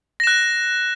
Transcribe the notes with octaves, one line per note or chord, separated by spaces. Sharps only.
F#6 A#6 E7